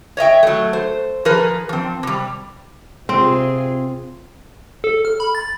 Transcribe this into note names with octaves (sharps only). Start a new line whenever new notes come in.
C#5 D#5 E5 G5
F#3 A3
C5
F3 G#4 A#4 B4
F3 C4
C3 G3
C3 C4 F4 G#4
A4
F6
B5
A6